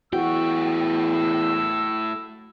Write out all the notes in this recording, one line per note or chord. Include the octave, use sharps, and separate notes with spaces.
E2 A2 F#4 G5 E6